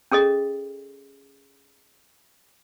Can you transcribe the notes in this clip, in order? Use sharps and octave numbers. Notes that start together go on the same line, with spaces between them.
C#4 G#4 A4 D#5